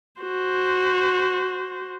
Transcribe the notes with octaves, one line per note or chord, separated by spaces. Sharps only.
F#4 C5